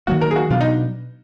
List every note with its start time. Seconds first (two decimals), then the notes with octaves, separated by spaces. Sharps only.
0.07 D#3 F#3 A#3 F#4
0.21 A#4
0.31 G#4
0.36 F#4
0.50 B2 F#3 B3 D4 F4
0.61 D#4